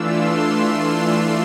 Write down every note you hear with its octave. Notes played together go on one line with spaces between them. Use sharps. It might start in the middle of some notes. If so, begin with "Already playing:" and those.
Already playing: E3 A3 D4 F4 E6
C6